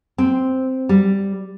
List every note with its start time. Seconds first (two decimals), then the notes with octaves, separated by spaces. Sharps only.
0.18 C4
0.89 G3